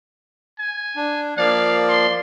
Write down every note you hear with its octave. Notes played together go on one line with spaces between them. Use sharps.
G#5
D4
F3 A#3 D5 F5
C6